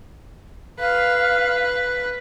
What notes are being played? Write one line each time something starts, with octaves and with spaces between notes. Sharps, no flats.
B4 F5